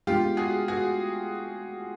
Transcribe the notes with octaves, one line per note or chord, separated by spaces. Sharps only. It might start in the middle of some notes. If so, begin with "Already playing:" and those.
G#3 B3 D4 F4 G4
F#4 G#4
F#4 G#4